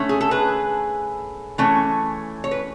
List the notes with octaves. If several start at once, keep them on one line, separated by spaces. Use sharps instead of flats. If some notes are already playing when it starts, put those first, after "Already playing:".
Already playing: D3 A3 C#4
G#4
A4
G#4 B4
E3 A3 C#4
C#5
B4